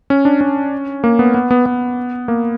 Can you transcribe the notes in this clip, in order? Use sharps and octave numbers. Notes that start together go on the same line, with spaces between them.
C#4
D4
C#4
A#3
B3
B3
B3
B3
A#3